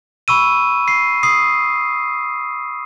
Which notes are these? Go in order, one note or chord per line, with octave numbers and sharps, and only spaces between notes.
B5 C#6 E6 D#7
C7
D#6 C7